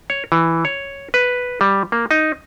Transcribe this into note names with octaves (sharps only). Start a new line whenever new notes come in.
C#5
E3
C#5
B4
G3
A#3
D#4